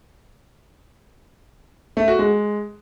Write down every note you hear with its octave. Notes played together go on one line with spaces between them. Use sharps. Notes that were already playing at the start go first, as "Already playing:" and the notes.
A3
F#4
G#3